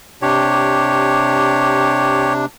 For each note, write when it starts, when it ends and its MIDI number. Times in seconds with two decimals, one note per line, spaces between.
0.22 2.45 48
0.22 2.45 62
0.22 2.33 67
0.22 2.33 73